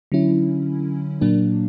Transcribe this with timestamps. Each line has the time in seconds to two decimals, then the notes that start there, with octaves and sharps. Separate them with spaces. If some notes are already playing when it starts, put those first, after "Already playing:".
0.12 D3 F#3 C#4 E4
1.21 A#2 F#3 A#3 D4